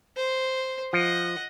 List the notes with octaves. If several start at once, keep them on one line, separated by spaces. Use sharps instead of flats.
C5
F3 D#5 F#5